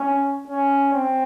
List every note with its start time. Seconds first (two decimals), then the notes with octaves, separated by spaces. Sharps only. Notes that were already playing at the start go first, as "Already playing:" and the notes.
Already playing: C#4
0.47 C#4
0.94 C4